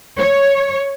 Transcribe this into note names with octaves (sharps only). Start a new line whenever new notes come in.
C#5